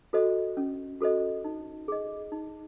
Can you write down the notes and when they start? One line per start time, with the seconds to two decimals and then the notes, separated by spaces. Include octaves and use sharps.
0.13 F#4 A4 C5 D#5
0.57 C#4
1.01 F#4 A4 C5 D#5
1.44 D#4
1.88 G#4 D#5
2.32 D#4